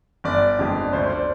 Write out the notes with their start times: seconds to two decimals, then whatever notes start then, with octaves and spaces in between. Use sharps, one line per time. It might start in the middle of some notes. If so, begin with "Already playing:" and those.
0.24 G1 D5
0.59 F2 D3 G#3
0.93 D2 C5
1.03 C5
1.10 D5